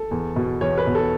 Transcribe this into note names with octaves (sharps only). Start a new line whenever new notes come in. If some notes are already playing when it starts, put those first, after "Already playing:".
Already playing: A4
E2
B2
E2 C#5
B4
B2
A4